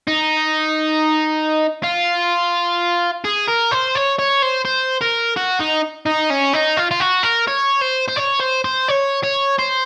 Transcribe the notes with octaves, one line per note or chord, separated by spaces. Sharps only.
D#4
F4
G#4
A#4
C5
C#5
C#5
C5
C5
A#4
F#4
D#4
D#4
C#4
D#4
F4
F4
F#4
A#4
C#5
C5
C5
C#5
C5
C5
C#5
C#5
C5